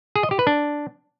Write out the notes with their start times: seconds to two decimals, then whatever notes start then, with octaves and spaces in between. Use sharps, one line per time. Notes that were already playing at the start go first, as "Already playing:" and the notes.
0.16 G#4
0.23 D#5
0.31 G4
0.39 B4
0.47 D4